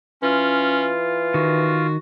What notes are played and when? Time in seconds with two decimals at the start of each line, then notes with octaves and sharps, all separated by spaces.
0.22 E3 C#4 F4
1.34 D#3 F#4